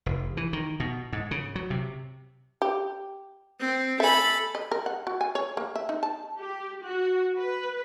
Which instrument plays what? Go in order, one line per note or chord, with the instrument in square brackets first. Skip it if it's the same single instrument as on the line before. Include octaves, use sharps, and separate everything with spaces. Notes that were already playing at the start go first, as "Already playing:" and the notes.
[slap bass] F1
E3
D#3
B2
G#2
C#3
F#3
C3
[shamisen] G4
[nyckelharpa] C4
[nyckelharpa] A4 B5 [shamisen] E5 G#5
[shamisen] D#5
A#4
F#5
F#4
G#5
C#5
A#3
E5
D#4
A5
[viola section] G4
F#4
B4